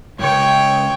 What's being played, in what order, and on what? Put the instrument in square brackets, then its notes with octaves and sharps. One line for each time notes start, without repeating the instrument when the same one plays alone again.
[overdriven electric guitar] C#2 G2 [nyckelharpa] C#5 G5